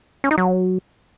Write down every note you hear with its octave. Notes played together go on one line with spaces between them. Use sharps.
C#4
D#4
F#3